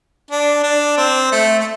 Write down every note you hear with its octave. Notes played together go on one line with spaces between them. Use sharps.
D4
D4
C4
A3
A3